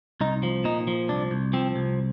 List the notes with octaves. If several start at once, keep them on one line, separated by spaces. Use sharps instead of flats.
C2 D#4
F3
A#2 D#4
F3
C2 D4
C2
F3 C4
C2